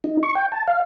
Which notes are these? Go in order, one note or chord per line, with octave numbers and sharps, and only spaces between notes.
D#4
C#6
G5
A5
F5